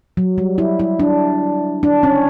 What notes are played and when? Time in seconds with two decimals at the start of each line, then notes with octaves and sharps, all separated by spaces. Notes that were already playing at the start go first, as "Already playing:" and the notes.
0.17 F#3
0.38 G3
0.58 E4
0.79 E4
1.00 D4
1.83 D4
2.03 C#4